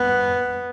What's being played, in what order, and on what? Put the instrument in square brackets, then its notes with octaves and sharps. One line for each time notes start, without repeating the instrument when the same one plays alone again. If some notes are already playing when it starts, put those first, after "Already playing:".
Already playing: [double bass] B3